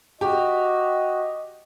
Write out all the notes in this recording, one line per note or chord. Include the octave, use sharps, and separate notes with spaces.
F#4 G4 D#5